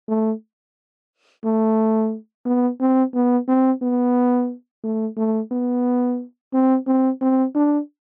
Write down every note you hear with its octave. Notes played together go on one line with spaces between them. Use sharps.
A3
A3
B3
C4
B3
C4
B3
A3
A3
B3
C4
C4
C4
D4